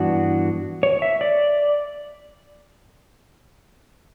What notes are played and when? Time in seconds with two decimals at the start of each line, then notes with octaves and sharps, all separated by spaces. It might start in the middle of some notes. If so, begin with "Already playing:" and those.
Already playing: G2 E3 B3 D4 F#4
0.83 C#5
1.02 E5
1.21 D5